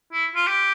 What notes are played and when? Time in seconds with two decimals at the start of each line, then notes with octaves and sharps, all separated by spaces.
0.13 E4
0.35 F4
0.48 G4